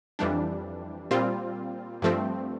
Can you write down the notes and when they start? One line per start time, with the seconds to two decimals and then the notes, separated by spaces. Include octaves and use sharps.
0.19 F2 E3 G3 D4
1.11 A#2 G3 C4 F4
2.02 G2 F3 A3 C4